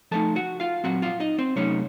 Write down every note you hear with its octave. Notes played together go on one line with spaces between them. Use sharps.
F3 A3 D#4 A4 A5
F#4 F#5
F4 F5
A#2 F#3 C4 F#4 F#5
F4 F5
D#4 D#5
C4 C5
C3 F#3 A3 C#4 D#4 C#5